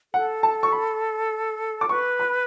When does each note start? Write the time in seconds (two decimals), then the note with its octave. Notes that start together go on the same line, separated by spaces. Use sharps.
0.14 A4 F#5
0.43 A5
0.63 C#6
0.72 B5
1.81 D6
1.89 B4 C#6
2.20 B5